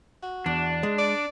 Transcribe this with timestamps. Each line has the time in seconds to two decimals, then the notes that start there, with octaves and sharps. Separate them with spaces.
0.23 F#4
0.46 E2 D4
0.83 G#3
0.98 D5